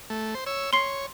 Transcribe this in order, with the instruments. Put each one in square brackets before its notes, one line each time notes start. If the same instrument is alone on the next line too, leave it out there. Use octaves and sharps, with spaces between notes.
[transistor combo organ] A3
C5
C#5 E6
[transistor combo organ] C#5 [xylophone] C6 C7